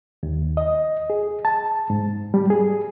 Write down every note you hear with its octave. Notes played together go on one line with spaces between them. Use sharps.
D#2
D#5
G#4
A5
G#2
G3
G#4